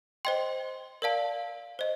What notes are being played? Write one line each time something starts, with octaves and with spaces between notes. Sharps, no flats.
C5 D#5 G5 C6
A#4 D5 F5 A5
C5 D#5